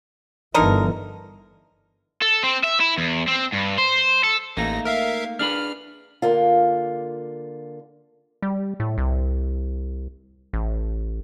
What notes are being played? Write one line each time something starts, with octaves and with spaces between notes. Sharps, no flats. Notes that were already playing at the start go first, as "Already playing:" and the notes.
G1 D3 E3 D#4 A#4
A4
C4
E5
E4
E2
C4
G2
C5
A4
A1 A3 A#3 D#4 A#6
A#4 E5 F5
D4 G#4 B4 F6
D3 A#3 F4
G3
A2
C2
A1